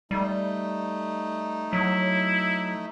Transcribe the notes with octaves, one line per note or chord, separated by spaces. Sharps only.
G3 A3 D#4
F#3 E4